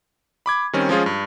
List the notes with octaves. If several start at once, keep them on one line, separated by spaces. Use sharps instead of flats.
B5 D6 G#6
D#3 G3 C4 C#4
F3 G#3 C#4 F4 G#4
G2